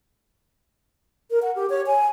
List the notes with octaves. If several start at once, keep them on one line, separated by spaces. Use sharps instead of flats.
A#4
F#5
G4
C#5
G#5